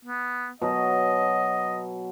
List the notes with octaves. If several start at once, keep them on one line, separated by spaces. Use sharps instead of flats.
B3
B2 F#3 D#5